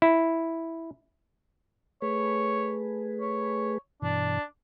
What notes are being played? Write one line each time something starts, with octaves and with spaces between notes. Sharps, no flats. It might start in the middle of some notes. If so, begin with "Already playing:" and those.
E4
A3 G#4 B4 C#5
C#5
G2 B2 E3 D4